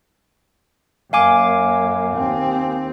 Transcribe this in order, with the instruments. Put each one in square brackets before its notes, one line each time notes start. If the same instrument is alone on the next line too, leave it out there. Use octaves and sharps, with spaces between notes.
[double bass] F#2 A#3 [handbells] F5 G#5 D6
[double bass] D#2 C4